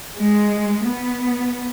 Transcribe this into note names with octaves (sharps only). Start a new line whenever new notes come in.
G#3
B3